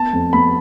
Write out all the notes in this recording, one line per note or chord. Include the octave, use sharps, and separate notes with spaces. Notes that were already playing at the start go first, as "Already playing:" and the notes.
Already playing: B3 A5
F2
B3 B5